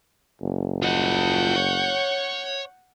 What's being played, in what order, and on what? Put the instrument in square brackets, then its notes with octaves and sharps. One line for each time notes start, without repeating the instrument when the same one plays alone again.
[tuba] F#1
[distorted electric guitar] F4 D#5 [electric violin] F#5 G6
[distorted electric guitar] C#5